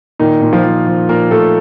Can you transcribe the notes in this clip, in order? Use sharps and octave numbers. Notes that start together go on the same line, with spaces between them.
A#2 D#3 D#4
A#2
F3 F4
F3
F3
A#2 A#3 A#4
A#2 A3 A4